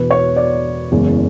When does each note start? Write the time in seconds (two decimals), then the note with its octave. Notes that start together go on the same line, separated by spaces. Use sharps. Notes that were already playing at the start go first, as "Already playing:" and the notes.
Already playing: E1 E2 B2 B4
0.11 C#5
0.36 D5
0.92 F#1 E2 C#3 G#3